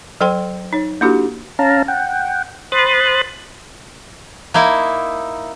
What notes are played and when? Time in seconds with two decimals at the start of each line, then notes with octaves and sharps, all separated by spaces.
0.21 F#3 A4 C5 G5 C6
0.73 D#4 C#5
1.01 A#3 D4 E4 F#4 G4 A4
1.59 C#4 F5 A5 A#5
1.88 F#5 G5
2.72 C5 B5 C6 D#6 F#6 A6
4.54 A#3 D#4 E4 E5